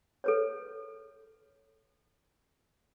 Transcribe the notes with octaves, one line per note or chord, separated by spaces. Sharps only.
A4 B4 C#5